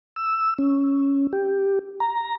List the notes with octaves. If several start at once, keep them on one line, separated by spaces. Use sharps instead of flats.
E6
C#4
G4
A#5